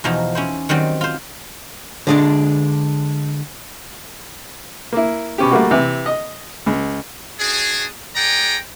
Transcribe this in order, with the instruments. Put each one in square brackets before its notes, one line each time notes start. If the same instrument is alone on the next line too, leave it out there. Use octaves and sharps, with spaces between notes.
[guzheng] E2 B2 F3 D#4 G#5
C#4 E4 C5
D#3 F#3 G3 C4
F4 C5
[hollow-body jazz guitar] D3 G#3 D4
[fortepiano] A#3 E4
B2 C#4 G4
G3 A3 A#3 F#4
C3 E3
D#5
C#2
[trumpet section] D4 F#4 G#4
G#4 D5 F#5 G5 A#5